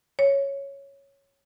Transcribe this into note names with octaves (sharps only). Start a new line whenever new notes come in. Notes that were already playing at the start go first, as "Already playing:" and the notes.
C#5